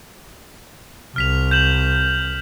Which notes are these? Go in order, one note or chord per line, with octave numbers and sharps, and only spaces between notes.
C2 F6 B6 F7
G6 E7 F#7